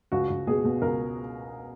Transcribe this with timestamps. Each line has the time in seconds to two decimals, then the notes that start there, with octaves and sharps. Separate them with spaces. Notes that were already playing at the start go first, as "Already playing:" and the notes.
0.12 C#2 F#4
0.30 C#2
0.47 B2 G#4
0.64 B2
0.82 C#2 A#4